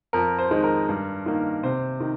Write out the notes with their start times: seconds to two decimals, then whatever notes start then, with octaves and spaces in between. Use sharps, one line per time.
0.13 F2 A#4
0.39 C5
0.51 D#3 G#3
0.64 A#4
0.89 G2
1.26 D#3 A#3
1.63 C3 C5
2.01 D#3